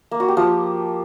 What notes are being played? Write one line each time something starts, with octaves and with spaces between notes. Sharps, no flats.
A#3
F#4
G4
F3